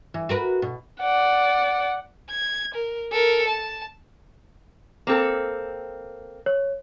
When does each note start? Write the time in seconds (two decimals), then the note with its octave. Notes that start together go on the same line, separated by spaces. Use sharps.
0.14 E3
0.29 F#4 A#4 B4
0.62 B2
1.01 D5 F#5
2.31 G#6
2.74 A#4
3.12 A4 A#4
3.48 A5
5.07 A#3 C4 A4
6.46 C#5